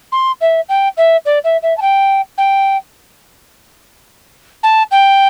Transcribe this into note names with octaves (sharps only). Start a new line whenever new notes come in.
C6
E5
G5
E5
D5
E5
E5
A5
G5
G5
A5
G5